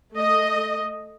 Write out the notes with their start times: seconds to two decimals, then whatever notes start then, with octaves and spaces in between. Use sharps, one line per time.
0.14 A3 D#5